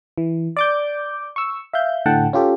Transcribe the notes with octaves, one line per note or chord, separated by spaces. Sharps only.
E3
D5 D6 G6
C#6 E6
E5 F5 G6
A2 D3 F#5 G5 A5
C#4 F4 G4 A4